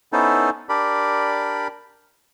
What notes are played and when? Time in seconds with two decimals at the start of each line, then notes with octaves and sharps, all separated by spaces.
0.13 B3 C#4 D#4 E4 A4 C5
0.69 D4 G4 A#4 D5 B5